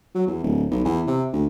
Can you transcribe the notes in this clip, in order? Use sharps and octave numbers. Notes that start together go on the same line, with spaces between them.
F#3
E2
D1
B1
E2
C3
D2